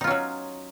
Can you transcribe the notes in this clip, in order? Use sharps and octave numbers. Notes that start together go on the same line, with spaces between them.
F#3 C#4 D#4 F4